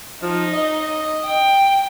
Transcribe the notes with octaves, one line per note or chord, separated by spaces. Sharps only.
F3 D#4
D#5
G5